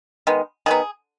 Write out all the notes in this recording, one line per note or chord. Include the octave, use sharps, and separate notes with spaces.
D#3 G#3 B3
D#3 F#3 B3 G#4